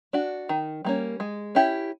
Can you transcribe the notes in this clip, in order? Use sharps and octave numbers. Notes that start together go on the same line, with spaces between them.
D4 F#4
D#3
G3 A#3 C#4
G#3
C#4 E4 G4